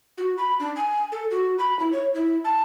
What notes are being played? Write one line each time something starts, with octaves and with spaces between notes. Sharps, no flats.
F#4
B5
D4
G#5
A4
F#4
B5
E4
C#5
E4
A5